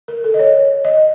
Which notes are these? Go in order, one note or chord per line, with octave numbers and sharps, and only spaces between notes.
A#4
A4
D#5
C#5
D#5